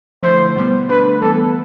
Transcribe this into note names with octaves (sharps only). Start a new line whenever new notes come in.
D3 F3 A3 E4 C5
B2 G3 B3
D3 A3 D4 B4
E3 G3 B3 A4